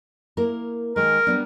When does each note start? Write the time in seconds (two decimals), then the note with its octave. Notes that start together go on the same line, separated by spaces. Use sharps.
0.37 A#3 E4 A#4
0.96 D#3 G#3 A#4
1.27 G3 B3 D4